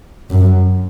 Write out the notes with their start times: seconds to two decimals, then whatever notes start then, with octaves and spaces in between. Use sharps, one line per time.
0.30 F#2